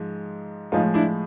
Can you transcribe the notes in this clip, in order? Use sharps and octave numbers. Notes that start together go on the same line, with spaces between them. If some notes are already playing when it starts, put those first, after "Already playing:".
Already playing: G#2 F3 G#3
A2 F3 G#3 D#4 F4
D4 E4